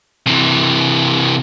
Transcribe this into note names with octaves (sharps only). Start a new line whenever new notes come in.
C3 E3